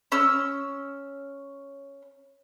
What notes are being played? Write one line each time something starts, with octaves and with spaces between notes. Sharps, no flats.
C#4 E6